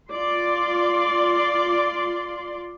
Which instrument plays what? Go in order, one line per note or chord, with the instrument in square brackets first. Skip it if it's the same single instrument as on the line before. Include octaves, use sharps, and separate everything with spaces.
[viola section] F4 D5 C6